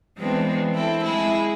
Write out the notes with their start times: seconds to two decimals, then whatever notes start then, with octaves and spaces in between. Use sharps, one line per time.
0.18 E3 G#3 B3 C4 D4
0.73 C4 E4 A4
1.02 G#3 E4 G#4